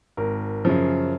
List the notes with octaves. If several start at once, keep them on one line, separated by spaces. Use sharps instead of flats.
G#1 A#4
F#2 C#3 F3